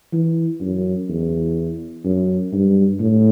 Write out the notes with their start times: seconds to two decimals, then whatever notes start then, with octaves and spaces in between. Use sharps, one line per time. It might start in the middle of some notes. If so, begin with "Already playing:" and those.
0.13 E3
0.61 F#2
1.09 E2
2.05 F#2
2.53 G2
3.00 A2